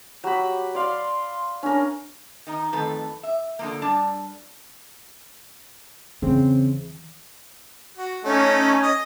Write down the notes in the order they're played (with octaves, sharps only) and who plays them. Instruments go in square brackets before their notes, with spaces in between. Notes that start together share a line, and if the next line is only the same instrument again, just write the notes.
[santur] F#3 B5 [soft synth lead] G4
[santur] D5 F5 [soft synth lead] C6
[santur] C#4 A#4 [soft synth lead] D4
[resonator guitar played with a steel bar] D#3 D#4
F2 D#3 A3 A4 B4
E5
D3 F3 A#3
G3 D4 A5
[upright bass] E2 E3 [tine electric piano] C#3 [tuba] C4
[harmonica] F#4
[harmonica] A3 D#4 [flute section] C#4
[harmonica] D#5